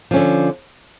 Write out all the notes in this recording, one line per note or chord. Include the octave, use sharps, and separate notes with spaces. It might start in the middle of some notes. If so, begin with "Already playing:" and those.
D3 F3 C#4